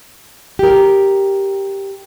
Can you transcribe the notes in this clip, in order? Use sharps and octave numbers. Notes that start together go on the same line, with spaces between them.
G4 A#4